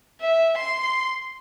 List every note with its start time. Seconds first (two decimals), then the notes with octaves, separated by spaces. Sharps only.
0.21 E5
0.57 C6